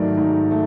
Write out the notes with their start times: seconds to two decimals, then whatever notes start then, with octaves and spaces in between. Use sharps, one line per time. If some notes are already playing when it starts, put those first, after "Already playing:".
Already playing: G#2 D#3 F#3 A3 D5
0.18 G#2
0.51 A3